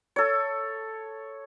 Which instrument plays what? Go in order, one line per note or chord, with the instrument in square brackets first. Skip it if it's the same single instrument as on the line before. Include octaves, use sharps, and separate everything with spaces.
[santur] A4 C#5